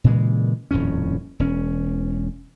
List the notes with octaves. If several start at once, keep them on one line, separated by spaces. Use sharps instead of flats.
A#2 C#3 E3 G#3
D#1 F2 A2 C#4
E1 C#4